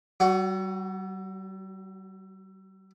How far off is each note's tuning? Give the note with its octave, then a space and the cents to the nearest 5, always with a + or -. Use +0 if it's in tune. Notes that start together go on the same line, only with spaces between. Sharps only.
G3 -45 F#4 +5